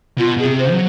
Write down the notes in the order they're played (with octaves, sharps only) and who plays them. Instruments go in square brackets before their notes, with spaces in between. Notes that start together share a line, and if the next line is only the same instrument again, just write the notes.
[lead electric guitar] B2 [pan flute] F4
[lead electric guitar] B2 [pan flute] G#4
[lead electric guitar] C3
[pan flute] C5
[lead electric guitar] F#3